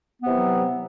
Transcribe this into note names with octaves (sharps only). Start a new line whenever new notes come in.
C3 E3 F#3 B3